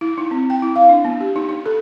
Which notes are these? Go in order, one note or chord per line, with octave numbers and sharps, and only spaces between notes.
E4
D#4
C4
G5
E4
F5
D4
B3
G4
D#4
D#4
A4